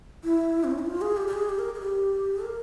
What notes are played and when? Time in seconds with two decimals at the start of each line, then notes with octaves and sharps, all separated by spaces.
0.24 E4
0.64 C4
0.71 C#4
0.79 E4
0.86 F4
1.01 G#4
1.17 G4
1.27 G4
1.33 G#4
1.49 G4
1.59 A#4
1.75 G#4
1.81 G4
2.43 A#4